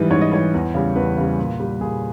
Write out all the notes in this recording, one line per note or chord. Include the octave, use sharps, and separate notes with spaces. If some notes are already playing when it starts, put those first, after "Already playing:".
Already playing: G#2 E3 G3
G#2 C#5
D#5
E3 G3 C#5
E2
C#3 G3
E2 B4
C#3 G3
A#2
G3
A#2 G#4